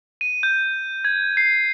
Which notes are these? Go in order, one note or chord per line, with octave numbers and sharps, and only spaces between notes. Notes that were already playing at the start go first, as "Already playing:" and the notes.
D#7
G6
G#6
C7